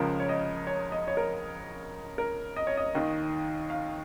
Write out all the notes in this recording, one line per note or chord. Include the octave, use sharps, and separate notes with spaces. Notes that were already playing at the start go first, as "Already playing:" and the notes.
Already playing: C#2 C#3 F3 A#4
C#5
D#5
C#5
D#5
C#5
A#4
A#4
D#5
C#5
D#5
D#2 D#3
F5